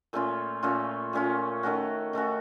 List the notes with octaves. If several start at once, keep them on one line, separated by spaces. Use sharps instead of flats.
A#2 A3 C#4 F4
A#2 A3 C#4 F4
A#2 A3 C#4 F4
D#3 A3 C#4 F#4
D#3 A3 C#4 F#4